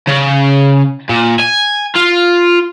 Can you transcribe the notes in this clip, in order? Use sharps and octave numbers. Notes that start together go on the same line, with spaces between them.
C#3
A#2
G#5
F4